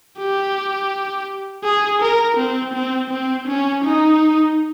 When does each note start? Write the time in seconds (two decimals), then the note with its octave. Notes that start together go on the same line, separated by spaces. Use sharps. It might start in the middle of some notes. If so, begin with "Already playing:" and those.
0.18 G4
1.64 G#4
2.01 A#4
2.37 C4
2.74 C4
3.10 C4
3.47 C#4
3.84 D#4